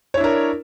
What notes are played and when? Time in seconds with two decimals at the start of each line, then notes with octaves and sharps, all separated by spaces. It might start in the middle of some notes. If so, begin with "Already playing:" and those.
0.14 C#5
0.17 E4
0.21 D4
0.24 A#4